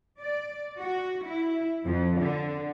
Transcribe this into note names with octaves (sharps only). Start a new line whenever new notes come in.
D5
F#4
E4
F2
D3